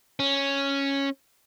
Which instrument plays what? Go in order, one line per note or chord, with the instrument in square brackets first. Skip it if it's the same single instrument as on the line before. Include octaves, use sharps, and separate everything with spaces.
[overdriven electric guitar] C#4